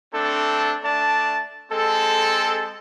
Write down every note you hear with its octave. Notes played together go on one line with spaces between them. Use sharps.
A3 C4 D4 A4
A3 D4 D5 A5
G#3 C4 A4